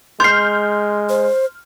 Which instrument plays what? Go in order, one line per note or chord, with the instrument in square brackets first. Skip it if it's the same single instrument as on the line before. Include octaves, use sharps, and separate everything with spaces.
[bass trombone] G#3 [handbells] C6 C7 [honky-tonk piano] F6 G6
[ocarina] C5